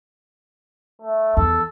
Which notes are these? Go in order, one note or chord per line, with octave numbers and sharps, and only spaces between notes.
A3
E2 A4